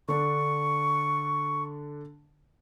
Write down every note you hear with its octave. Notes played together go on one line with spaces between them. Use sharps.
D3 D4 C#6